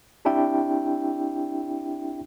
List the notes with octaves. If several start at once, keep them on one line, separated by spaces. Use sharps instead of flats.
C4 D4 E4 G4 E5 G5